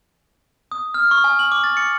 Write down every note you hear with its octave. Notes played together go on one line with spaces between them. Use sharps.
D#6
F6
C#6
G#5
F#7
D6
A6
C#7